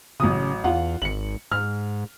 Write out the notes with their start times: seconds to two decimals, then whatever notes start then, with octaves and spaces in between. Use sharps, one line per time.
0.20 A1 C#3 F#3 D#6
0.64 E2 F4 F5 F#5
1.02 G#1 C#7 F#7
1.52 G#2 F6